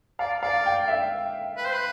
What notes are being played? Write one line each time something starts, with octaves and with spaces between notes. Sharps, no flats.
D5 F5
D5 F5
G5
E5
B4
C5
B4